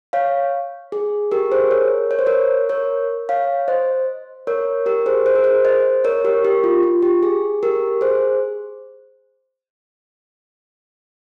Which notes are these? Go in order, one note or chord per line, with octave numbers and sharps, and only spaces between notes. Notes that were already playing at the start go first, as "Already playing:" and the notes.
C#5 F5
G#4
G4 A#4
G#4 C5
A#4 C#5
C#5
C5
A#4 C#5
A#4 C#5
C#5 F5
C5 D#5
A#4 C#5
G4 A#4
G#4 C5
C5
A#4
G#4 C5
C5 D#5
A#4 C#5
G4 A#4
G4
F4
F4
G4
G#4
G4 A#4
G#4 C5